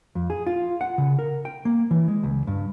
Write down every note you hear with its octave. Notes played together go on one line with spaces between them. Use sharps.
F2
G#4
F4
F#5
C#3
A#4
G5
A#3
E3
G#3
C#2
G2